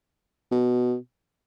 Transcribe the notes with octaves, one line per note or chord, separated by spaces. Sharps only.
B2